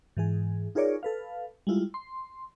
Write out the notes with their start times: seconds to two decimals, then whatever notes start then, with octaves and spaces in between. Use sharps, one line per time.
0.17 G#2 E3 G#4
0.75 D#4 F4 G#4 A#4 C#5 D5
1.03 A4 B4 F5
1.67 G3 G#3 E4 F4
1.94 C6